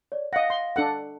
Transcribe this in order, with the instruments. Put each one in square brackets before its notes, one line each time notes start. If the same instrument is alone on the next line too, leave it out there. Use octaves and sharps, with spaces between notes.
[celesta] C#5 D5
[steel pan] D#5 F#5 [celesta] F5 A#6
[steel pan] C6
D4 A4 F#5